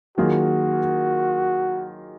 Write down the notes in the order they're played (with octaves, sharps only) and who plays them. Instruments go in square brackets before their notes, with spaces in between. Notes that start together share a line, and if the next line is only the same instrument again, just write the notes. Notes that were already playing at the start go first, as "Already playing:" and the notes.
[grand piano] D#3 F#3 A#3 F4 G#4 [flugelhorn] F#4